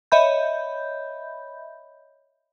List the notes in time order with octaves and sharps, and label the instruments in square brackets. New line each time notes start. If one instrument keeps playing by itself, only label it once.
[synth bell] C#5 D#5 E5 B5 G6